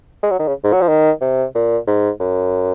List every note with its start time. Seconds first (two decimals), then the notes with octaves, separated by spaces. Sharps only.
0.23 G#3
0.31 F#3
0.39 D#3
0.47 C#3
0.64 G#2
0.73 F#3
0.81 F3
0.88 D#3
1.21 C3
1.55 A#2
1.87 G#2
2.20 F#2